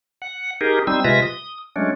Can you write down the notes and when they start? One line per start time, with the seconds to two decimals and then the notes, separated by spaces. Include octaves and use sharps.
0.22 F#5
0.61 D#4 G4 G#4 A#4
0.87 G3 C4 D#4 E6
1.04 C3 G#3 F4 B4 E5 A#6
1.22 D#6
1.76 F#3 G#3 A3 C#4 D4